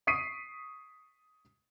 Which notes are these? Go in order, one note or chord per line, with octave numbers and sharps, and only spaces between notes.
C#6 D#6 B6 C7 D7 D#7